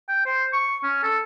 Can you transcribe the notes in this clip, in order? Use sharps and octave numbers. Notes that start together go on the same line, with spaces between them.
G5
C5
C#6
C#4
A4